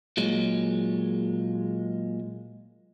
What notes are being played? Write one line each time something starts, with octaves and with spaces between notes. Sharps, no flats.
A#2 F#3 G#3